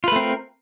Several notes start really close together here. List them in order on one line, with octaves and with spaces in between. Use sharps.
F4 B4 A3 C4 A#4